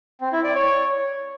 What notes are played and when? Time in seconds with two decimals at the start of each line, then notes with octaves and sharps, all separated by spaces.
0.21 C4
0.33 E4
0.44 D5
0.55 C#5